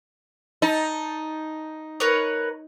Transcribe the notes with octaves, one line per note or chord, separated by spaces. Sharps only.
D#4 A5
A#4 B4 C#5